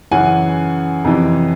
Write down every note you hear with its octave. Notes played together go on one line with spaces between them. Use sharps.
F#2 C#3 E3 F#5 G#5
F2 C3 E3